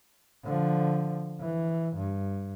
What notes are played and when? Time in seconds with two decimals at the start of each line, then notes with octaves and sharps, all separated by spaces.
0.44 D3 F3
1.41 E3
1.96 G2